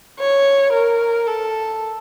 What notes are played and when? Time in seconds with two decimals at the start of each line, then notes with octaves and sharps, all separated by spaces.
0.20 C#5
0.73 A#4
1.27 A4